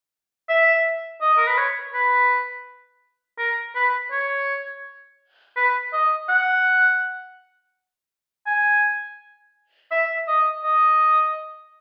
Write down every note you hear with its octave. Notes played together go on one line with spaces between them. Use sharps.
E5
D#5
A#4
B4
C#5
B4
A#4
B4
C#5
B4
D#5
F#5
G#5
E5
D#5
D#5